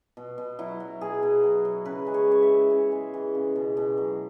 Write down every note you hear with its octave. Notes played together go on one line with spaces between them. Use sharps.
B2
B2
F#3 E4
F#3
B2 G#4
B2
F#3
F#3
C#3 B4
G#3
C#5
E3 C#5
E5
C#3
C#3
G#3
E3
C#3
B2
B2
F#3